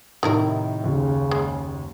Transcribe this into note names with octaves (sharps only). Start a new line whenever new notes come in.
A2 C3 D#3 D#4 E4 A#4
F#1 D#2 C#3
G#3